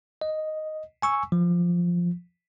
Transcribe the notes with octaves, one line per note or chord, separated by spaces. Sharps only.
D#5
G#5 C#6 E6
F3